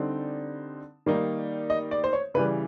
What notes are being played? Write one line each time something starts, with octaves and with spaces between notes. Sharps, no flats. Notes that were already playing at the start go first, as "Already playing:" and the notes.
Already playing: D3 G3 C4 D#4 D5
D#3 G3 A#3 D#4
D#5
D5
C5
C#5
C#3 E3 G3 B4